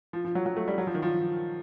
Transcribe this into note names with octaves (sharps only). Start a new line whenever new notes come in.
F3
F3
F#3
F#3
A3
G3
F#3
F3
D#3
F3